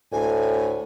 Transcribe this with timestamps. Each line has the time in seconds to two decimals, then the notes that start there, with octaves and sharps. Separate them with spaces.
0.12 D2 A2 G#5